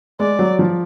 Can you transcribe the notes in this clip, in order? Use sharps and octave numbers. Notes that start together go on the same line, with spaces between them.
G#3 D5
F#3
F3